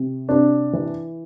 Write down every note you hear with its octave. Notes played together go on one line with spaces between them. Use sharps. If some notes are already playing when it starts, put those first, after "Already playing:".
Already playing: C3
C3 D4
E3